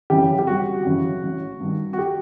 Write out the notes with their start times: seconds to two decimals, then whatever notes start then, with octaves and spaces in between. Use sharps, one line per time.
0.10 F#2 C#3 E3 G4
0.39 G4
0.47 G1 F#4
0.85 F#2 C#3 E3
1.23 A1
1.60 G2 D#3
1.93 F#4
1.98 G4